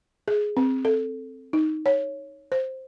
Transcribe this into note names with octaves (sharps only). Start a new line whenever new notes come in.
G#4
C4
A4
D#4
C#5
C5